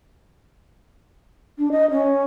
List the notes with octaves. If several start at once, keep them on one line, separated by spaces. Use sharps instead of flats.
D4
D#5
C#4